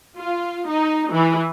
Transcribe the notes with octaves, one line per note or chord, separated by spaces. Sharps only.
F4
D#4
E3